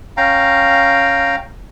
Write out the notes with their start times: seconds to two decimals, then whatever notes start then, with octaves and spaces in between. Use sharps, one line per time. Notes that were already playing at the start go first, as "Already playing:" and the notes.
0.17 C#4 F5 G5 A#5